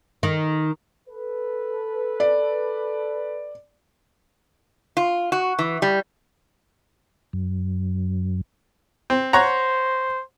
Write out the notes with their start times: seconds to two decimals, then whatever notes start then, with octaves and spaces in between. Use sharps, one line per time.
0.23 D#3
1.08 A4 B4
2.20 D5
4.97 F4
5.32 F#4
5.59 E3
5.82 G3
7.33 F#2
9.10 C4
9.33 C5 C#5 F#5 A#5